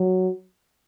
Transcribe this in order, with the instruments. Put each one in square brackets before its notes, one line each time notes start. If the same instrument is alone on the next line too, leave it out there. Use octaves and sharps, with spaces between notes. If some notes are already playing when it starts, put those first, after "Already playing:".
Already playing: [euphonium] F#3